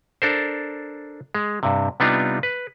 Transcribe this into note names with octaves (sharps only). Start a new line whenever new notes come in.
D4 A4 A#4 C5
G#3
G2 C3
C3 G3 B3 D4 D#4 F4
B4